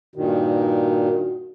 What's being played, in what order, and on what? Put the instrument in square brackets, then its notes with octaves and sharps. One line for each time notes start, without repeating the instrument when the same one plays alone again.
[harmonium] G2 A#2 D#3 [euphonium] F#4